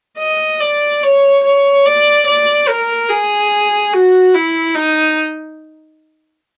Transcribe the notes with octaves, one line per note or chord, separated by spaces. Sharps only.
D#5
D5
C#5
C#5
D5
D5
A#4
G#4
F#4
E4
D#4